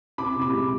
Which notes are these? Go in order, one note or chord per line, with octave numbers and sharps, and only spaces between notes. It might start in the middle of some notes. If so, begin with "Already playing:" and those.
C3 B5 D6
C3
B5 D6
G#3